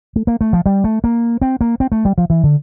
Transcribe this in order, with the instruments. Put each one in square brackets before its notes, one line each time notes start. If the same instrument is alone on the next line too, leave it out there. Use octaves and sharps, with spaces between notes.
[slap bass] A3
A#3
A3
F3
G3
A3
A#3
C4
A#3
C4
A3
G3
F3
E3
D3